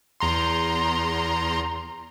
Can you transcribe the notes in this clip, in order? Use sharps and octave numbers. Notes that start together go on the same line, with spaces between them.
E2 A#5 C6